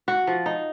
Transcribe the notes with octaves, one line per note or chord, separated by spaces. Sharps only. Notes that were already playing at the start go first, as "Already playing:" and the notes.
F#4
F3
D#4